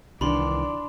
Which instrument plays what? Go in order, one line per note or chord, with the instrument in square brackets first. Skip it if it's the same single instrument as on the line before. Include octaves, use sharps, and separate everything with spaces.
[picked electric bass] C2 D#3 E3 [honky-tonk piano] D4 [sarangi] D5 [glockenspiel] B5 C6